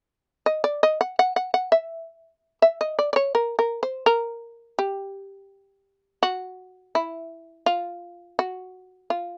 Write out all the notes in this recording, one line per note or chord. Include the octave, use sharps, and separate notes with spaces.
D#5
D5
D#5
F#5
F#5
F#5
F#5
E5
E5
D#5
D5
D5
C#5
A#4
A#4
C5
A#4
G4
F#4
E4
F4
F#4
F4